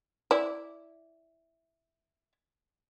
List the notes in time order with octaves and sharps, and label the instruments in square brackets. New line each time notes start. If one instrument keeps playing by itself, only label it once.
[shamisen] E4 D5